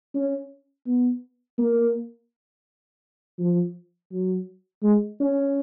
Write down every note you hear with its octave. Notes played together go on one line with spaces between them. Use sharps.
C#4
B3
A#3
F3
F#3
G#3
C#4